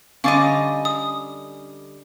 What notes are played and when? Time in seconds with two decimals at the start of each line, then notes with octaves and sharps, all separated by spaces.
0.24 D3 G3 C#4 D#5 F5 D6 A6
0.85 D#6